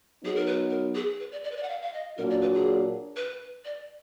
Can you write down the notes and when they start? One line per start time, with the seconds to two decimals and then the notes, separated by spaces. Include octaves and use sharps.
0.21 F#3 B3 D#4 G#4
0.35 A#4
0.46 B4
0.70 A#4
0.95 G#4
1.20 B4
1.32 D5
1.44 D5
1.51 B4
1.57 D5
1.63 F#5
1.69 F5
1.82 F5
1.94 D#5
2.17 A#2 F#3 A#3 D4 F#4 A#4
2.30 D5
2.42 B4
2.55 G#4
3.16 B4
3.65 D5